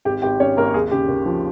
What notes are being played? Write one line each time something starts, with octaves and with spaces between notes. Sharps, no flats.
G#1 G4 G5
G#1 G4 G5
G#1 C#4 C#5
G#1 A#3 A#4
D#2 G#4
C#3 G4
D#2
F3